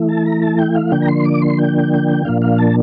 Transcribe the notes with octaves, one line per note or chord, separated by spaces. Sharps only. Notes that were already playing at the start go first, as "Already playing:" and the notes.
Already playing: E3 A3 E4
A5
A#5
A5
G5
F5
D3 F3 A#3 D4 G5
A#5
C6
D6
C6
G5
A#2 F3 A#3 D4 F5
F5
A5